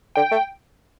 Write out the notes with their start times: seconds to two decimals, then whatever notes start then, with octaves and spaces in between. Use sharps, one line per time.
0.15 D3 G5
0.31 A3